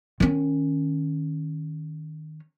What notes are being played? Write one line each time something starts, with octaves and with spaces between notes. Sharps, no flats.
D#3 C#4